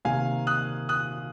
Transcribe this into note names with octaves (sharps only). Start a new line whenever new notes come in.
C3 D#3 A#3 F5 G#5
D#6 F#6
D#6 F#6